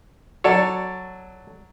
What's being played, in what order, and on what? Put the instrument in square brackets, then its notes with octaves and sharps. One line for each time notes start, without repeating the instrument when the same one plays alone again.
[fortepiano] F#3 D5 [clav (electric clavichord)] A4 C#5